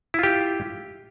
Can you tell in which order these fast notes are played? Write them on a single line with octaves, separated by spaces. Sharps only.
E4 F4 G4